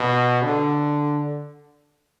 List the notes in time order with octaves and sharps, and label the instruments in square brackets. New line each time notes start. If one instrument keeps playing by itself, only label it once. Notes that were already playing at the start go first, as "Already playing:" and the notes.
Already playing: [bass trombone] B2
D3